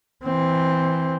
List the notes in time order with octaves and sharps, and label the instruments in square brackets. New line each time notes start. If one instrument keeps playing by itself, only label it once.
[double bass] E3 C4